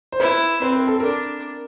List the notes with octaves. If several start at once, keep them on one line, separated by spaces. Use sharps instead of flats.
C5
E4 B4
C4 B4
A#4
A4
D4 A#4